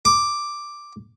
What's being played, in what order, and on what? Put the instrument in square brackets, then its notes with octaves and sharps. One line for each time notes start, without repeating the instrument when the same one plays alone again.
[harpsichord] D6